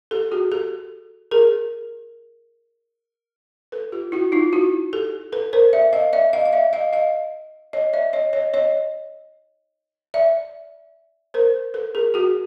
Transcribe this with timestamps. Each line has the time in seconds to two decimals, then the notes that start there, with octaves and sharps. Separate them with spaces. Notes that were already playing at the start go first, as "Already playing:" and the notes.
0.11 G4 A4
0.32 F#4 G#4
0.52 G4 A4
1.31 G#4 A#4
3.72 A4 B4
3.92 F4 G4
4.12 E4 F#4
4.32 D#4 F4
4.53 E4 F#4
4.93 G4 A4
5.33 A4 B4
5.53 A#4 C5
5.73 D5 E5
5.93 D#5 F5
6.13 D5 E5
6.33 D#5 F5
6.46 F5
6.53 D5 E5
6.73 D#5 F5
6.93 D#5 F5
7.73 C#5 D#5
7.93 D5 E5
8.13 C#5 D#5
8.33 C#5 D#5
8.54 C#5 D#5
10.14 D5 E5
11.34 A#4 C5
11.74 A4 B4
11.95 G#4 A#4
12.14 F#4 G#4